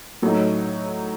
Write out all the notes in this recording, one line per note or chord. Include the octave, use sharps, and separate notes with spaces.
A2 F#3 A3 D#4